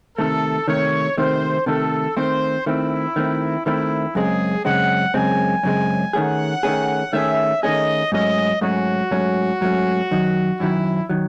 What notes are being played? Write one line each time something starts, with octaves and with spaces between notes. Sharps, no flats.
C3 D#3 A3 A4
C3 D#3 A3 C#5
C3 D#3 A3 C5
C3 D#3 A3 A4
D#3 A3 C4 C5
D#3 A3 C4 E4
D#3 A3 C4
D#3 A3 C4 E4
F#2 C#3 G#3 C4 G#4
F#2 C#3 G#3 C4 F#5
F#2 C#3 G#3 C4 G#5
F#2 C#3 G#3 C4
D#3 A3 C#4 G#4 F#5
D#3 A3 C#4 G#4
D#3 A3 C#4 G#4 E5
D#3 A3 C#4 G#4 D#5
G#2 F#3 A3 C#4 D#5
G#2 F#3 A3 C#4 F#4
G#2 F#3 A3 C#4
G#2 F#3 A3 C#4
F#2 D#3 F#3
F#2 D#3 F#3 E4
D#3 F#3